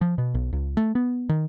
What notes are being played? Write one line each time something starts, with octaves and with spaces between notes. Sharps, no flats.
F3
B2
B1
C#2
A3
B3
D#3